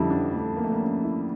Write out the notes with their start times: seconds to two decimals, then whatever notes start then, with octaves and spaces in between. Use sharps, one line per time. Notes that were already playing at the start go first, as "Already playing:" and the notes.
Already playing: F2 D3 G3 C#4 D4 E4
0.10 D4
0.33 A3
0.57 A#3
0.64 A3
0.72 A#3
0.80 C#4
1.03 E4